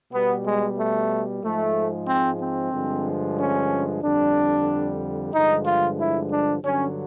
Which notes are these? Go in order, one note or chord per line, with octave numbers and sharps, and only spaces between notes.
B2 G3 B3
G#3
A3
G#2 F3 G#3 A3
C4
C4
G2 D3 F3 G#3
C#4
F2 D3 G3 D4
G2 D3 F3 G#3 D#4
F4
E4
D4
G2 D3 F#3 C#4